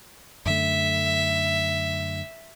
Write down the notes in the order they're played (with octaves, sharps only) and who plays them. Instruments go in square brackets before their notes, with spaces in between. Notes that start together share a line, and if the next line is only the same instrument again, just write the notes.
[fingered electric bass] F#2 D3 A3 [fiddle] E5